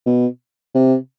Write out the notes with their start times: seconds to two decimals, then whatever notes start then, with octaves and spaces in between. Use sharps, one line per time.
0.06 B2
0.75 C3